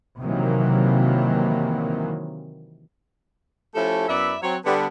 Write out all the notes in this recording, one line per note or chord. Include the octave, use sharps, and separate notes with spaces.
C3 D#3 E3 F#3 A#3
F3 A3 C#4 E4 G4 A4
F#2 B3 E4 D5 E5
F#3 C4 C#5
D3 G3 B3